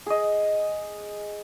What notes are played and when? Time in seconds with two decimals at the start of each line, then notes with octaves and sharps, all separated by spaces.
0.06 G#4 D#5